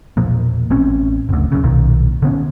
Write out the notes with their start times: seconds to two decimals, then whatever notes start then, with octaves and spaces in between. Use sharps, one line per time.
0.17 E1 A#2 F3 A#3
0.70 A1 C4 C#4
1.29 F#1 D2
1.52 F#2 C#3
1.63 B1 A#2 D#3
2.22 D3 B3 C#4